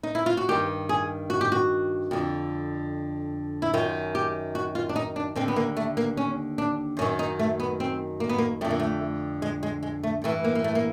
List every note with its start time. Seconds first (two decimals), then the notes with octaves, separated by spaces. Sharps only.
0.03 D#4
0.15 E4
0.26 F4
0.37 F#4
0.49 G2 D#3 G4
0.89 G#4
1.30 F#4
1.41 G4
1.52 F#4
2.11 F2 D3
3.62 E4
3.74 F#2 D#3 F4
4.15 G4
4.55 F#4
4.75 F4
4.89 D4
4.96 D#4
5.16 D4
5.36 D#2 D3 C4
5.48 B3
5.56 A#3
5.77 A3
5.97 A#3
6.17 C#4
6.58 D4
6.99 F#2 D#3 C#4
7.19 D#4
7.39 A3
7.60 B3
7.80 C4
8.20 A#3
8.29 B3
8.38 A#3
8.61 F2 D3 A3
8.71 A#3
8.80 A3
9.42 G#3
9.63 G#3
9.83 G#3
10.03 A3
10.24 G2 E3 A3
10.44 A#3
10.55 A#3
10.64 A3
10.75 A#3